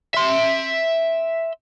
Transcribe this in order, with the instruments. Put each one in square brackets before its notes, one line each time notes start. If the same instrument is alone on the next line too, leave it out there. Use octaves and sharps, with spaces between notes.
[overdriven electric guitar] E5 C6